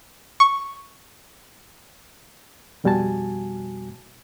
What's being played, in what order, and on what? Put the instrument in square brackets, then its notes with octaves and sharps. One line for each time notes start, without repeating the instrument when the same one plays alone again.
[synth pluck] C#6
[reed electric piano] F2 B2 G3 F#4 G#5 A5